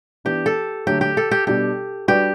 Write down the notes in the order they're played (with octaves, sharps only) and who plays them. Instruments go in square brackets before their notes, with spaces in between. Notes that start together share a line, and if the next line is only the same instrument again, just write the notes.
[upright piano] E3 B3 D4 [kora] G4
[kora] A4
[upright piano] D3 F#3 A3 [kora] G4
[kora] G4
A4
G4
[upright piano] B2 G3 D4 [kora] G4
[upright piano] G3 D4 F#4 B4 D5 [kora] G4